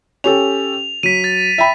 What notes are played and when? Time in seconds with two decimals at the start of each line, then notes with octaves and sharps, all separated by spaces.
0.24 C#4 G4 A4 F7
1.03 F#3 B6 D#7
1.24 A6
1.58 E5 G5 B5